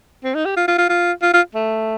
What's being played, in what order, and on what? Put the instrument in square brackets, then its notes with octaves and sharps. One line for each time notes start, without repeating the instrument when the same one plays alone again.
[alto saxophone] C4
D#4
G4
F4
F4
F4
F4
F4
F4
A3